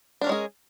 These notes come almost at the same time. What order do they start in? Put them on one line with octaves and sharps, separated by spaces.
D4 A#4 C#4 G#3 G#4